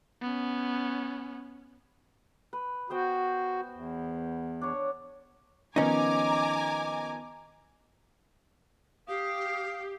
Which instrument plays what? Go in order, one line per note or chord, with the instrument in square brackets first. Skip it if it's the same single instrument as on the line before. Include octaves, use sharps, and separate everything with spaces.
[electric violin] B3 C#4
[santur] B4
[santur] B3 C5 G5 [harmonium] F#4
[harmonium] E2
[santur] D4 C#5
[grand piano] D#3 F3 B3 [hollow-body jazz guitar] C#4 D#4 [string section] G#5 A#5 D6
[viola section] G4 [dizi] F5 [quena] D#6